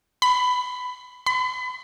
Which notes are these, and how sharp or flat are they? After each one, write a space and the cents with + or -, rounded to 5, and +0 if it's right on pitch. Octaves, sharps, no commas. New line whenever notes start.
B5 +15
B5 +40